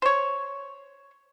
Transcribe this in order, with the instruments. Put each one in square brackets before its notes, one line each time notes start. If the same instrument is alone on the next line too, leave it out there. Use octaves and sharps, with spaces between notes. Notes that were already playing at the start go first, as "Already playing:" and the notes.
[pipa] C5 C#5